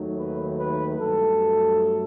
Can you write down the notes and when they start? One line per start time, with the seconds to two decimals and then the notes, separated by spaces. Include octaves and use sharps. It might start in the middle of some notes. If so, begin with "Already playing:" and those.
Already playing: D#2 D#3 F#3 A3
0.18 B4
0.58 B4
0.98 G2 F#3 A3 A4